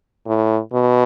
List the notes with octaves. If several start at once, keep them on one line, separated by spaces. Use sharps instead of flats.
A2
B2